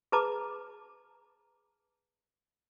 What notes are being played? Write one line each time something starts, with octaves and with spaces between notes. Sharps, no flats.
G#4 B4 A5 A#5 D6